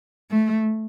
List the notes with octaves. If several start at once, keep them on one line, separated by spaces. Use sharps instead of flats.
A3